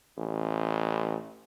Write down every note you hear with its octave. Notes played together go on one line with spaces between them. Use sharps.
A1